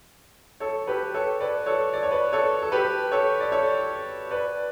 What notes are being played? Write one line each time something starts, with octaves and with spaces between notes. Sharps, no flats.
A4 C#5
G4 B4
A4 C#5
B4 D5
A4 C#5
D5
C#5
B4 D5
A4 C#5
A4
G4 B4
A4 C#5
D5
A4 C#5
B4 D5